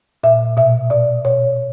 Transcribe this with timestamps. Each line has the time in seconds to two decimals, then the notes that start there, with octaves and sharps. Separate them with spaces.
0.24 A#2 E5
0.57 B2 E5
0.90 B2 D5
1.25 B2 C#5